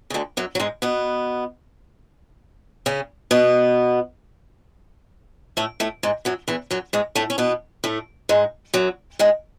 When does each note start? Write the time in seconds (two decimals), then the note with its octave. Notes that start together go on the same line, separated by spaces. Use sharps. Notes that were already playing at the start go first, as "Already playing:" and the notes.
0.10 C#3
0.14 D2 D3
0.37 F#2 F#3
0.55 F#3
0.60 G#2 G#3
0.82 B2 B3
2.86 C#3 C#4
3.31 B2 B3
5.57 A2 A3
5.80 A2 A3
6.03 G#2 G#3
6.25 F#2 F#3
6.48 E2 E3
6.71 F#2 F#3
6.93 G#2 G#3
7.15 A2 A3
7.30 C#4
7.38 B2 B3
7.84 A2 A3
8.29 G#2 G#3
8.74 F#2 F#3
9.19 G#2 G#3